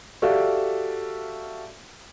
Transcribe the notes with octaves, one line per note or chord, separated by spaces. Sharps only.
F#4 G4 A4 D5 E5 F5